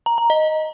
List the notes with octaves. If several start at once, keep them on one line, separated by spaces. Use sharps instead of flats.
A#5
A#5
D#5